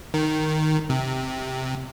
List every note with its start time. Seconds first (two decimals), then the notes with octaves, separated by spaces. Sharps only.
0.14 D#3
0.90 C3